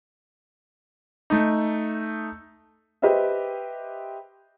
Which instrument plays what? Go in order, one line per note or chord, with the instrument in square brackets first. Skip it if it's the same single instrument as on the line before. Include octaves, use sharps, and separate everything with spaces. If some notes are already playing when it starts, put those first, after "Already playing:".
[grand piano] A3 D#4
[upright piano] G4 B4 C5 D#5 E5